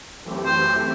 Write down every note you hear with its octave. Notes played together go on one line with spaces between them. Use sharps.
F#2 E3 A3 C4 G4
C5